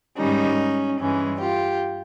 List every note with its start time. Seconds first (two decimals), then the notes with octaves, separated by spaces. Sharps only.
0.17 G#2 D#3 G3 C#4 D#4
0.98 G2 E3 G#3 C#4
1.39 F4 G4